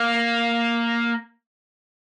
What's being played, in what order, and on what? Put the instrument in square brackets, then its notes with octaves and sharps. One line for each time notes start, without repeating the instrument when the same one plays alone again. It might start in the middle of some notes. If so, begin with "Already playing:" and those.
Already playing: [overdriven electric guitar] A#3